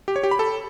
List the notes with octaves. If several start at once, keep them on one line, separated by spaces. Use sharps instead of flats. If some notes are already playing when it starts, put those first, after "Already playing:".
G4
C#5
G4
B5
A4